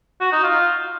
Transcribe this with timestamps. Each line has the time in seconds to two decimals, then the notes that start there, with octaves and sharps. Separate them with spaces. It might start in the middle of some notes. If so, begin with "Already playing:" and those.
0.21 F#4
0.32 D#4
0.44 F4